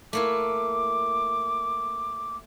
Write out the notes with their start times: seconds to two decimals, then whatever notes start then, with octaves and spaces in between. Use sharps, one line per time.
0.13 A3 A#3 E4 D6